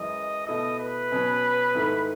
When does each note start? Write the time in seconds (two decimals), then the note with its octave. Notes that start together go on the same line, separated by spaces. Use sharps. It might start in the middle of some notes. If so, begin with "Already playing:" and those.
Already playing: F#2 E3 G#3 D#5
0.47 B2 A3 E4 A4 D#5
0.79 B4
1.12 B2 F#3 C#4
1.75 G#2 D#3 A3 E4 A4